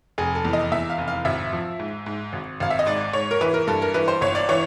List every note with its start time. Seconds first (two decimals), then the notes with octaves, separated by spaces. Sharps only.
0.18 F1 G#4
0.35 A4
0.45 E2
0.53 D#5
0.72 E2 E5
0.90 F5
0.98 F1
1.08 F5
1.25 G#1 E5
1.53 F3
1.79 G#2
2.06 G#2
2.33 G#1
2.60 G#1 F5
2.70 E5
2.79 D#5
2.86 G#2 D5
3.13 G#2 C#5
3.31 A#4
3.41 E3 B4
3.54 A#4
3.67 G2 A4
3.82 A#4
3.94 E3 B4
4.08 C5
4.21 G1 C#5
4.35 D5
4.49 E3 C#5